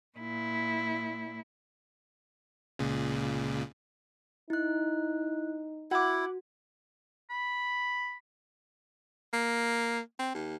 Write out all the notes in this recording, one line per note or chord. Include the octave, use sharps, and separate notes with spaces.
A#2 E4
C#2 A#2 C#3
D#4 E4 F#6
E4 F#4 F#5 D6
B5
A#3
C4
D#2